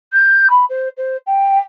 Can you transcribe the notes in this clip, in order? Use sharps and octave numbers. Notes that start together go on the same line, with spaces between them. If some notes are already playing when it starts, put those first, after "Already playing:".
G6
B5
C5
C5
G5